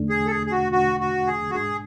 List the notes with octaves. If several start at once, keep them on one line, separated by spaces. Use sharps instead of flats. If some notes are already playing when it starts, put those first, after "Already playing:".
Already playing: E2 D3 A3 D4
G#4
A4
G#4
G#4
F#4
E2 D3 A3 D4 F#4
F#4
G#4
F#4
G#2 G#3 D4 G#4